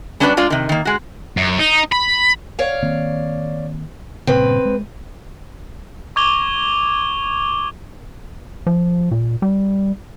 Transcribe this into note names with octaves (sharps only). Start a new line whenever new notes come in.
G3 C#4 D4 F#4 B4 D5
G#3 F4 D5
C3 D#3
D#3 A#3
G#3 F#4
F#2
D#4
B5
C#5 D5 F5
D#3 A#3 C4
G2 A#2 C#3 C4 B4
G#3
C#6 D6 G#6 F7 G7
F3
A#2
G3